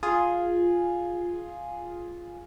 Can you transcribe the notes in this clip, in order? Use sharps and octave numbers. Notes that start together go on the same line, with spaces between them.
F4 G#4